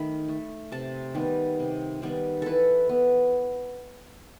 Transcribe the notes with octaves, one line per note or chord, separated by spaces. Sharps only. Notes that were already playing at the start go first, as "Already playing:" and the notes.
Already playing: D#3 A3 B5
A3
C3 A5
D#3 G3 B3
C3
D#3 G3 B3
E3 A4 B4
B3